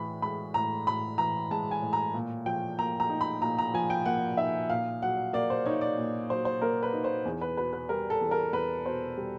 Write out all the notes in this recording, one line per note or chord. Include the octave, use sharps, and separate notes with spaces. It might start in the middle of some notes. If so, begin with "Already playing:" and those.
Already playing: A2 E3 B5
G#3 B5
A2 A#5
A2 B5
E3 A#5
G#3 A5
G#5
A2
A#5
A#2
F3 G5
A#3 A#5
A#5
D#4
B5
A#2 A#5
A#5
F3 G#5
G5
A#3 F#5
D#4 E5
A#2 F5
F#3 F#5
A#3 D5
C5
D#4 C#5
D5
A#2
F#3 C5
C5
A#3 A#4
B4
D#4
C5
E2
B4
B2 B4
B4
G3 A#4
A4
E2
A#4
E2 B4
B2 C5
G3